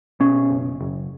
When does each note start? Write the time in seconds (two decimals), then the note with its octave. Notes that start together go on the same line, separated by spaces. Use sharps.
0.20 B2 C#4
0.50 F#1
0.81 F#1